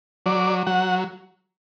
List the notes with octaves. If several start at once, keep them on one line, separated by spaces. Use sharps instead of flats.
F#3 D5
F#3 F#5